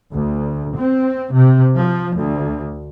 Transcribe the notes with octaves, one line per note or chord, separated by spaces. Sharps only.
D2
C4
C3
F3
D2